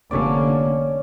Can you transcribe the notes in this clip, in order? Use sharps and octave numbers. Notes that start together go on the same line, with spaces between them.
F1 D3 A#3 C#4 C#5 D5